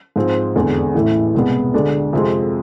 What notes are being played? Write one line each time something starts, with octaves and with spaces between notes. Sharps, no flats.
G#2 F3 G#3 C4 G#4
F1 E2 D3 G#3
A1 A2 E3 A3 E4
C2 B2 G#3 B3
D2 D3 G#3 D4
F2 C3 F3 G#3 C4